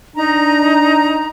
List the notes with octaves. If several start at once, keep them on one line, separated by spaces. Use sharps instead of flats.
D4 D#4 A#5